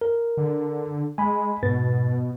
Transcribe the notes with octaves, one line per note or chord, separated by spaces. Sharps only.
A#4
D3
G#3 G#5 B5
G#2 B2 B4 A6